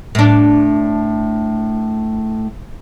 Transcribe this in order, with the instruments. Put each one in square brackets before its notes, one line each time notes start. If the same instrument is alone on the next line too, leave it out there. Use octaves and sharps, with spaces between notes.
[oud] A2 D4